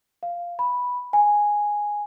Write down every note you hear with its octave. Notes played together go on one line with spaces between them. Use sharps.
F5
B5
G#5